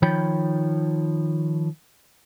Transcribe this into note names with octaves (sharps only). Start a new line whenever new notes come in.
D#3 F3 C#5 G5 B5